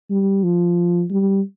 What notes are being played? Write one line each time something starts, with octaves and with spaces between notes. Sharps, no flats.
G3
F3
G3